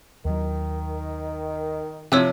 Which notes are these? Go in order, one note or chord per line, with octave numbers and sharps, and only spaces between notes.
D#2 D#3 F#3
C3 F3 C#5 E6 F#6